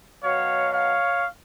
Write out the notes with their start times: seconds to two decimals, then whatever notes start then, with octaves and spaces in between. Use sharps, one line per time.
0.23 B2 F#3 C#5 F5
0.72 C#5 F5